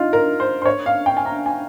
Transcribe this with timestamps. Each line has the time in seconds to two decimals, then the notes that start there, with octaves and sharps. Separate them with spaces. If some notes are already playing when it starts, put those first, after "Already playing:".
Already playing: D#4 F4
0.13 A#4
0.40 C5
0.62 C5
0.66 C#5
0.86 F5
1.06 G5
1.17 G#5
1.26 A#5
1.46 G#5